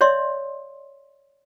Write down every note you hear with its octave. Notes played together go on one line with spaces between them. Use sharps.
C#5 D5 E5 C6